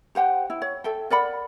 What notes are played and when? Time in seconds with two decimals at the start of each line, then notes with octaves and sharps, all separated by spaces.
0.15 G4 C5 F#5 G5
0.50 E4
0.62 C#5
0.84 A4 E5 G5
1.10 A#4 D5 F#5 B5